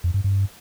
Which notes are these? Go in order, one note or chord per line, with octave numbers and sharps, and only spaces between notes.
F2
G2
G2